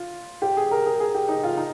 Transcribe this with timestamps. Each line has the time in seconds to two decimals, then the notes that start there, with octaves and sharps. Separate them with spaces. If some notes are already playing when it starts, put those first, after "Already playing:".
Already playing: F4
0.42 G4
0.57 G#4
0.71 A#4
0.86 G#4
1.00 G#4
1.15 G4
1.28 D#4
1.43 F4
1.57 D#4